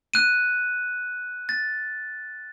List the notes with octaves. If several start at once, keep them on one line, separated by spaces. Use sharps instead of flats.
F#6 D#7
A6